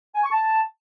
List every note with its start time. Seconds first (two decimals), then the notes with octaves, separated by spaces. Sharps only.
0.15 G#5
0.24 C#6
0.32 A5